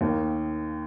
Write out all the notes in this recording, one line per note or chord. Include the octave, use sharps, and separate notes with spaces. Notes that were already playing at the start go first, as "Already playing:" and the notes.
D#2 D#3 A#3 D#4